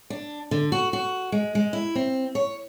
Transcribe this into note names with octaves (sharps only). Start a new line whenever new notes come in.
D4
D3
F#4
F#4
G#3
G#3
E4
C4
C#5